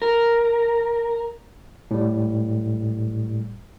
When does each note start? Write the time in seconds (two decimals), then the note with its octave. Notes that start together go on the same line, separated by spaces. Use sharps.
0.02 A#4
1.91 A2 G3